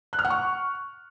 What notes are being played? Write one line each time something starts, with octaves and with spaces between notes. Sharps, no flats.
F#6
F6
F#5
C#6